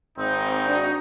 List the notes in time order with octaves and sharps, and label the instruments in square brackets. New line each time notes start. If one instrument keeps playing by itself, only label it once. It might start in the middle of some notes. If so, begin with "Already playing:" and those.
[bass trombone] G#1 [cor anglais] C4 [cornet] D#4
[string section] D4 F#4